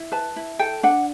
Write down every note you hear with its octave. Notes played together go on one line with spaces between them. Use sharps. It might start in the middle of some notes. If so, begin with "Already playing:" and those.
Already playing: E4
B4 A5
E4
A4 G5
D4 F#5